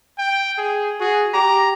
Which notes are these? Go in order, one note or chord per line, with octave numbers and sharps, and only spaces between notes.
G5
G#4
F#4 G#4
G4 A#5